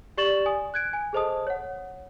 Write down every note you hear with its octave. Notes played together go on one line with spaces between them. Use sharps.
G4 D5 C#6 A6 E7 F#7
G#5 D#6
F#6 G#6 D7
G#5
G#4 A4 C5 D#5 A5 D#6
C#5 F#5